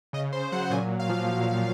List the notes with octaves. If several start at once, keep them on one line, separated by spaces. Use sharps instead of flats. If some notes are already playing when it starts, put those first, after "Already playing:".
C#3 D#5
C#3 C5
F#3 F#5
A#2 G#5
A#2
F5
F3